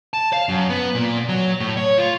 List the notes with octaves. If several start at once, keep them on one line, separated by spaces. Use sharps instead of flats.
A5
F5
F#2
B3
A#2
F#3
A2
C#5
F4